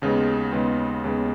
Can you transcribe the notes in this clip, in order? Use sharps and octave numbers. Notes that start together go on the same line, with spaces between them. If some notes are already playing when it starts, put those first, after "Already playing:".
D#2 C#3 G#3 B3
D#2 C#3 G#3 B3
D#2 C#3 G#3 B3